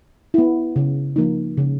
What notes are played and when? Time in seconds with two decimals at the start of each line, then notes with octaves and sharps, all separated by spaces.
0.34 B3 E4
0.76 C#3
1.16 F3 A#3 D#4
1.57 C#3